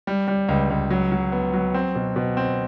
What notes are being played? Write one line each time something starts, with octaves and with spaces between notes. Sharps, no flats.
G3
G3
C#2
C#2
F#3
F#3
B3
F#3
C4
B2
B2
C4